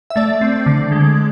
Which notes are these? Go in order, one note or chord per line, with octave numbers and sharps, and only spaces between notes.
E5
A3 D5
C4
D3
G#3